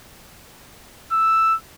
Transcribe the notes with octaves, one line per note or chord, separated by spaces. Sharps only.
E6